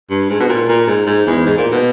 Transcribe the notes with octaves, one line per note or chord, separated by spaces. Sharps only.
G2
G#2
B2
A#2
A#2
G#2
G#2
E2
G#2
A#2
B2